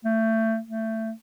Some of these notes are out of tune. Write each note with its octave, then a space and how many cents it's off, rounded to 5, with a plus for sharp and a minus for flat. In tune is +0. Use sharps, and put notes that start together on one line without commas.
A3 +20
A3 +15